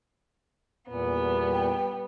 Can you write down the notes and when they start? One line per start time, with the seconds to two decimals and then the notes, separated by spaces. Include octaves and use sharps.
0.89 E2 A#2 G3 B3
1.52 G5